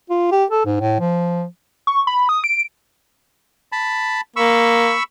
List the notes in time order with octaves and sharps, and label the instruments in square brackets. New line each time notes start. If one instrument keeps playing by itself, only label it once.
[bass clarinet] F4
G4
A4
G#2
A2
F3
[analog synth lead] C#6
B5
D#6
D7
[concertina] A5 B5
[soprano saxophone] A#3 [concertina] B5 C#6 E6